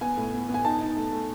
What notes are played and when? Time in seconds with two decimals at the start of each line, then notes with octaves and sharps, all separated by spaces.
0.01 B3 G#5
0.17 A2
0.33 B3
0.48 B3
0.54 G#5
0.65 D#4 A5
0.80 D#4
0.96 A3
1.12 A3